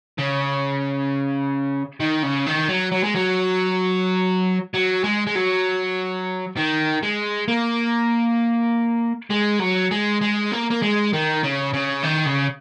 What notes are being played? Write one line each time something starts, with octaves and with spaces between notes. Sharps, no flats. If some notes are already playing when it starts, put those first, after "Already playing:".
C#3
D#3
C#3
D#3
F#3
F#3
G#3
F#3
F#3
G#3
G#3
F#3
D#3
G#3
A#3
G#3
F#3
G#3
G#3
A#3
A#3
G#3
D#3
C#3
C#3
D#3
C#3